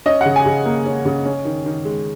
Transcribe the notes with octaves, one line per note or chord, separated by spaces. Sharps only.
C#4 D#5
C#3 F#5
G#5
C#3
A#3
C#4
C#3
C#4
D#3
D#3
G#3